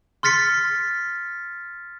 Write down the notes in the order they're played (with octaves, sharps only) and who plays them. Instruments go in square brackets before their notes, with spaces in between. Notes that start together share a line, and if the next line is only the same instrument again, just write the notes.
[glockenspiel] C6 F6 A6 B6 C#7